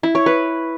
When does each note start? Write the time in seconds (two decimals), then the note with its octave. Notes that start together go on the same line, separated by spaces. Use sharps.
0.03 E4
0.15 C#5
0.26 B4